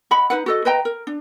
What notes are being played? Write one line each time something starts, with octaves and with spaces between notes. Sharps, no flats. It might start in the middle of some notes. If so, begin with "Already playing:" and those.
D#5 F#5 B5
D#4 B4 F#5
F#4 A4 D#5
B4 D#5 G5 A#5
A#4
D4